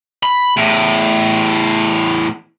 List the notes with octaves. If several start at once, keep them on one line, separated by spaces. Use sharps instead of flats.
B5
E2 A2